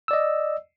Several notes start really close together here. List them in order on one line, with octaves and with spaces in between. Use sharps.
E6 D5 D#5